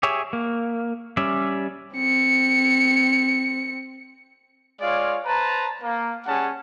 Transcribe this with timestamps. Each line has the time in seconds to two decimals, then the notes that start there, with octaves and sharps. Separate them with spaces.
0.03 G4 G#4 C#5 E5
0.33 A#3
1.17 G3 C#4 D5 E5
1.95 C4 C#7
4.81 G#3 F4 C#5 D5 F5
5.26 B4 C5 A5 A#5
5.83 A#3
6.25 G3 C#4 G#4 F#5 A5